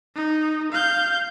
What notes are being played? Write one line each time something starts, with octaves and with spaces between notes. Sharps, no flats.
D#4
F5 G6